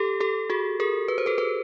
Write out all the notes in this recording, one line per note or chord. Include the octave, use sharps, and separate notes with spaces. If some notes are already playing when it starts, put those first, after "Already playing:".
Already playing: G4 A4
G4 A4
F#4 G#4
G#4 A#4
B4
C5
A4 B4
A4 B4